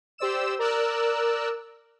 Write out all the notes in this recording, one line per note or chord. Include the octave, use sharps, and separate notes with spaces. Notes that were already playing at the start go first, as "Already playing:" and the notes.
G4 C5 D5 E6 E7
A#4 D5 E6 F#6